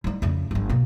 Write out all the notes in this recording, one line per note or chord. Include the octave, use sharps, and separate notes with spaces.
G3 D#4
F2 C#3
G1 G3
B2 A#3